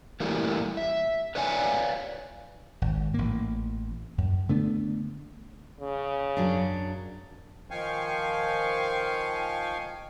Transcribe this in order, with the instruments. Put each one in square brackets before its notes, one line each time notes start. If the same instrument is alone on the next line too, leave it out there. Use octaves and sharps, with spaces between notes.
[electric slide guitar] E3 G3 A3 A#3
E5
B4 C#5 D5 F5 G#5
[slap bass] G#1
A1 A#3
F#2
D3 A3 B3 D4
[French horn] C#3
[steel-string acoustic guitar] F#2 F#3 D4
[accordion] D#3 F3 F5 G5 G#5 C#6